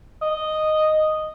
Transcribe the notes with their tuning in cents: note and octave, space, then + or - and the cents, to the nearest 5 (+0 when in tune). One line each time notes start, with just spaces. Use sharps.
D#5 -5